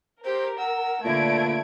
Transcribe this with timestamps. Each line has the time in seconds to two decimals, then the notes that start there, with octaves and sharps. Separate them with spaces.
0.25 G4 A#4 C5
0.58 F#5 E6
1.05 A#2 D3 A3 B4 E5 G#6 D7